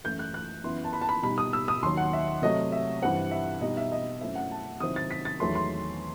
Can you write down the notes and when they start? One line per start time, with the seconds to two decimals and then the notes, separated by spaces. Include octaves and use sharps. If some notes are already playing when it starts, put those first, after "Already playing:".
0.04 F#2 E3 A3 E4 G6
0.19 F#6
0.34 F#6
0.63 F#2 E3 B3 E4 C6
0.84 A5
0.93 B5
1.01 A5
1.09 B5
1.23 B2 G3 D#4 B5
1.38 D#6
1.53 E6
1.68 D#6
1.82 D#2 D#3 F#3 C6
1.97 F#5
2.13 E5
2.42 C3 F#3 A3 D#5
2.72 E5
3.02 G2 E3 G3 C4 F#5
3.31 E5
3.61 B2 G3 D#4 D#5
3.77 E5
3.92 D#5
4.21 F#2 F#3 A3 C4 E4 E5
4.35 F#5
4.51 A5
4.80 C3 D#3 F#3 C4 E4 D#6
4.96 A6
5.11 B6
5.25 A6
5.40 E2 D#3 F#3 A3 E4 C6
5.55 C6